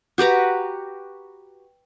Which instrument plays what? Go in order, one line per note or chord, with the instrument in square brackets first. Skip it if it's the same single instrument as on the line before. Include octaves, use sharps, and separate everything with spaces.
[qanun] F#4 G4 B4 A#5